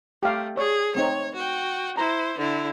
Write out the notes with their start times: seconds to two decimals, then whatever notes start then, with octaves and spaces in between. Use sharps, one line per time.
0.23 A3 G4 F5
0.57 G#4 C#5 D5
0.95 A3 C4 D#4 C#5
1.35 F#4 G5
1.97 E4 C5 A#5
2.38 D3 E4